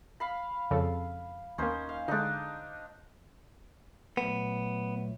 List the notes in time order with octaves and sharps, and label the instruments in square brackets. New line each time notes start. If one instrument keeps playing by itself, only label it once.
[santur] F5 B5
[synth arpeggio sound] F2 C#3 A4
[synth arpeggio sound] D#2 A#3 [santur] C#4 D#4 C5
[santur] F5
[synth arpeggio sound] D3 G#3 [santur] D4 D#4
[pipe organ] A#2 F#3 A3 [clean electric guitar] B3